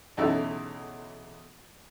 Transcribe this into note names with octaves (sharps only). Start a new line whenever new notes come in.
B1 E2 C#3 D#4 E4 A4